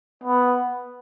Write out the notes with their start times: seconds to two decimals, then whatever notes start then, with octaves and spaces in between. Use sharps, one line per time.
0.24 B3